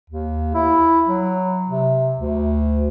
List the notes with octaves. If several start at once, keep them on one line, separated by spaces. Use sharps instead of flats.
D#2
E4
F#3
C3
D2